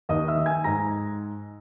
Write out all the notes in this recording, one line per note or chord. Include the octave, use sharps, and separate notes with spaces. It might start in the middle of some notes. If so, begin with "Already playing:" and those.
D#2 D#5 D#6
E5 E6
D#3
G#5 G#6
G#2 A#5 A#6